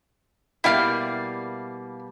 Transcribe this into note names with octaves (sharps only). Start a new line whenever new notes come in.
B2 G3 A#3 E4 G4 F5